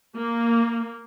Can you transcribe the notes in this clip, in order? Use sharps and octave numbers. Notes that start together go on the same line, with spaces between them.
A#3